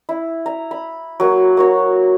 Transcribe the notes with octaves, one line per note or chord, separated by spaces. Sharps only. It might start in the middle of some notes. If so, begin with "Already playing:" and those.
E4
A#5
B5
F#3 A#3
A#3 F#4 C#5